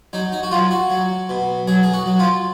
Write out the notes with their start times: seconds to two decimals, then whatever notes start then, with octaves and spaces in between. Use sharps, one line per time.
0.13 F#3 D#4
0.32 D#4
0.43 F#4
0.51 F#3 F4
0.71 F#4
0.90 F#3
1.29 B2
1.67 F#3 G#4
1.83 G#4
1.93 F#4
2.06 F#3
2.19 F4